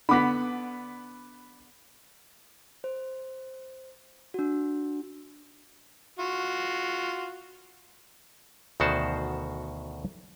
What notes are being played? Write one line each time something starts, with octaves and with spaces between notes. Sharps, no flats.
D3 B3 B5 D6 B6
C5
D4 F#4
F4 F#4
D2 B2 D#3 F#4 C5 A5